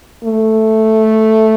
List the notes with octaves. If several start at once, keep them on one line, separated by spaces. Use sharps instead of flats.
A3